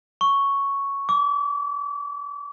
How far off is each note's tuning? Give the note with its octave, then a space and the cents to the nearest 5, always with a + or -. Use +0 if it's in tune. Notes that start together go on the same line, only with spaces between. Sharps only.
C#6 +0
D6 -35